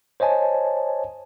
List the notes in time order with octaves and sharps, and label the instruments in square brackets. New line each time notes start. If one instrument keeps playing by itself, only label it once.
[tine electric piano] C5 C#5 D#5 G#5 A5